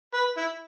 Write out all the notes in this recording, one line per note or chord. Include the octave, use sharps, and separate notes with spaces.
B4
E4